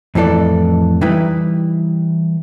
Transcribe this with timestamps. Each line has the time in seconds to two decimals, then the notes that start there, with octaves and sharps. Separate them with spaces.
0.15 F2 A2 E3 A4 D5
1.01 E3 G3 D#4 E4 B4